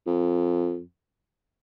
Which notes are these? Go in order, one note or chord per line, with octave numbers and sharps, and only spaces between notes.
F2